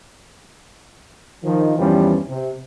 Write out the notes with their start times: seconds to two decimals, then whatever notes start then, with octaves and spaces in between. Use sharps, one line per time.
1.44 D#3 F3
1.78 E2 G2 E3 F3 G3 C#4
2.29 C3